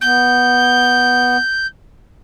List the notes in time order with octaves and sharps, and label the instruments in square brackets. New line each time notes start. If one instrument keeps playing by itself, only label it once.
[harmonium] B3 [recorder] G6